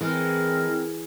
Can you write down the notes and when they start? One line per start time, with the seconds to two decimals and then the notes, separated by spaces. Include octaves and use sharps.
0.01 E3 G#3 C4 A#4